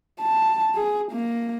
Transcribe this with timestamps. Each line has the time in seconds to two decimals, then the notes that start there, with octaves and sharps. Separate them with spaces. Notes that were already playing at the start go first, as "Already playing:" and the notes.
0.21 A5
0.75 G#4
1.11 A#3